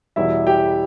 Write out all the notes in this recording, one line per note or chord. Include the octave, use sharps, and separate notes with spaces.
E2 B2 G3 E4 E5
G4 G5